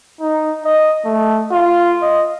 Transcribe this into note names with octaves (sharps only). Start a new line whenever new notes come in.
D#4
D#5
A3
F4
D#5